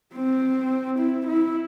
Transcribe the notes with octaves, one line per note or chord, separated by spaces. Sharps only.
C4
E4
E4